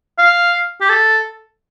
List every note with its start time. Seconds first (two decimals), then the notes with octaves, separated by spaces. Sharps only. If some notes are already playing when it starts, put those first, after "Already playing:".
0.19 F5
0.81 G4
0.89 A4